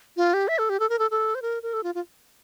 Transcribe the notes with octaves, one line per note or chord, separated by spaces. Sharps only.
F4
G4
E5
A4
G4
A4
A#4
A4
A4
C5
A#4
A#4
A4
F4
F4